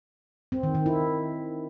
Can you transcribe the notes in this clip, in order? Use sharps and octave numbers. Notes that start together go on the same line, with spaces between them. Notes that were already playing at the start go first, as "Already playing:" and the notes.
C4
D#3
D#3
E4